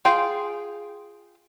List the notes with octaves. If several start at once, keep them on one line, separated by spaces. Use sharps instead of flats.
F4 G#4 G5